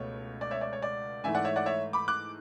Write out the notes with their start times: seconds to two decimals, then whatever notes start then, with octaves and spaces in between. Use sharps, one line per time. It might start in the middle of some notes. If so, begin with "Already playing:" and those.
Already playing: C#2 B2 A3 C#5
0.41 D5
0.51 C#5 E5
0.61 D5
0.73 C#5
0.82 D5
1.24 G#2 E3 A3 E5 G#5
1.35 D5 F#5
1.45 C#5 E5
1.56 D5 F#5
1.66 C#5 E5
1.93 B5 D6
2.08 D6 F#6